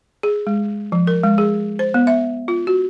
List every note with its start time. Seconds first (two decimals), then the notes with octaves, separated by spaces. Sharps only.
0.23 G#4
0.47 G#3
0.92 F3
1.07 A#4
1.24 G#3
1.38 G#4
1.79 C5
1.94 B3
2.07 E5
2.48 F4
2.67 F#4